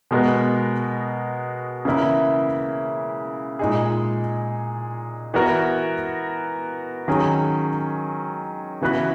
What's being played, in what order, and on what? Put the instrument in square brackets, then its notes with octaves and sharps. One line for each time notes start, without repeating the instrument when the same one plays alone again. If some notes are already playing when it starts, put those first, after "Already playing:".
[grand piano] B2 G#3 B3 F#4 A#4
C#3 E3 A#3 E4
A#2 G#3 D#4 G#4
E3 B3 F#4 A#4
D#3 F#3 C#4 G#4
C#3 E3 B3 F#4 B4